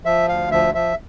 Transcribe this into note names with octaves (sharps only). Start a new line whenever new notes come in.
F3 E5
D2 F5
F3 E5
F3 E5